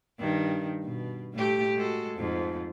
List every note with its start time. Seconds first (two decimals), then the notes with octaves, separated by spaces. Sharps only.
0.19 G2 D#3
0.84 B2
1.33 A2 A3 G4
1.76 G#3 F#4 A4
2.17 F2 G#2 F3